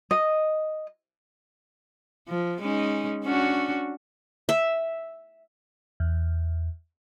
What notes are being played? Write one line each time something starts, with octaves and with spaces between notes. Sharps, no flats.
D#5
F3
G#3 C#4 D#4
C#4 D4 F#4
E5
E2